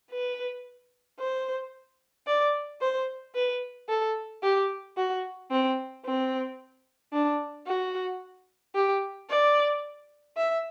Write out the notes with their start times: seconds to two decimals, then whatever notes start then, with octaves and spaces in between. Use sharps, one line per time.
0.11 B4
1.19 C5
2.27 D5
2.81 C5
3.35 B4
3.89 A4
4.43 G4
4.97 F#4
5.51 C4
6.05 C4
7.13 D4
7.67 F#4
8.75 G4
9.30 D5
10.37 E5